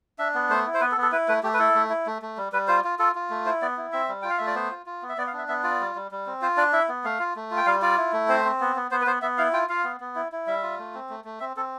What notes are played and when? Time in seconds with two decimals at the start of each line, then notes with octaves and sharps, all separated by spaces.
0.19 D4 E5
0.34 B3
0.50 A3 C5
0.66 E4
0.74 C5
0.81 B3 B4
0.92 A4
0.97 B3
1.02 A4
1.12 E4 B4
1.28 A3 B4
1.43 A3 G4
1.54 B4
1.59 E4 A4
1.75 A3
1.90 E4
2.06 A3
2.22 A3
2.38 G3
2.52 G3 B4
2.68 F4 C5
2.84 F4
2.99 F4 A4
3.15 F4
3.30 A3
3.45 E4 C5
3.62 B3 D5
3.77 E4
3.92 C4 E5
4.09 G3
4.22 F4 G5
4.30 F5
4.38 A3 E5
4.47 D5
4.55 B3 C5
4.71 F4
4.86 F4
5.02 B3
5.09 E5
5.17 B3 D5
5.27 F5
5.33 D4 E5
5.48 B3 E5
5.64 F4 D5
5.80 G3
5.95 G3
6.11 G3
6.26 C4
6.42 F4 C5
6.57 D4 D5
6.73 E4 E5
6.89 B3
7.04 A3 F5
7.19 F4
7.36 A3
7.51 F4
7.57 G5
7.66 G3 F5
7.82 F4 D5
7.97 E4
8.13 A3
8.28 C4 C5
8.45 C4
8.61 B3
8.76 B3
8.91 B3 C5
9.02 B4
9.07 B3 C5
9.22 B3 E5
9.38 E4 F5
9.53 F4 G5
9.69 F4 F5
9.84 B3
10.00 B3
10.15 E4
10.32 E4
10.47 G3 E5
10.63 F4
10.78 A3
10.94 C4
11.09 A3
11.25 A3
11.40 C4 E5
11.57 C4 A4